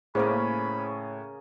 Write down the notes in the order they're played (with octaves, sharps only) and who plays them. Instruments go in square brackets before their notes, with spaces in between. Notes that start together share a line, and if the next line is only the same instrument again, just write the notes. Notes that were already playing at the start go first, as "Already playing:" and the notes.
[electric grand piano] A2 [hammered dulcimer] C#3 A#3 C#4 [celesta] G#4 C5 [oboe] B5